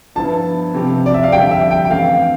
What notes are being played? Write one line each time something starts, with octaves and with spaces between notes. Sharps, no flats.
G2 F3 B3 E4 A5
C3 F3 C4 G4
D5
E5
F5
F2 D3 G3 G5
E5
G5
G5
G2 E3 A3 C4 F5